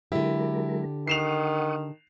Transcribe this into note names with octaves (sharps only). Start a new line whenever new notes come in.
D3 F#3 G#3 E4 G4 A#4
D#3 F#5 C#6 D#6 C7 E7 F7